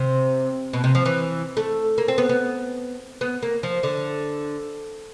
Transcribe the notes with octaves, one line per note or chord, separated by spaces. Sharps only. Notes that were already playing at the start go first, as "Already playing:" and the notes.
Already playing: C3
B2
C3
F3
E3
A3
A#3
C4
B3
B3
B3
A#3
F3
D3